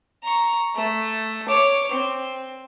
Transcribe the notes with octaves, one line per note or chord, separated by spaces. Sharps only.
A#5 C#6
A3
C#5 D6
C4